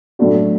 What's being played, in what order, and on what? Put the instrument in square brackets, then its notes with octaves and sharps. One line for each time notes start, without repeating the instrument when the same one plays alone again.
[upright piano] A2 F#3 A3 D4 F#4